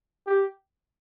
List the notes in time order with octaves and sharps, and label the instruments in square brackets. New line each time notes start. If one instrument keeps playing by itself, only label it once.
[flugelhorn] G4